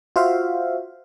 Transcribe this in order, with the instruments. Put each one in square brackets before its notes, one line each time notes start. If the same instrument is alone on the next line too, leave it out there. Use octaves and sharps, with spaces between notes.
[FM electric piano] F4 F#4 C5 E5 F5